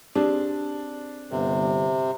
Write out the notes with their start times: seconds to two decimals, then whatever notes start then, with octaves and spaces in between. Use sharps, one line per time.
0.15 C4 D4 G4 G#4
1.31 G1 C3